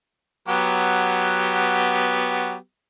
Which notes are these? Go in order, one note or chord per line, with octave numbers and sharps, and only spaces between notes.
F#3 B3 G4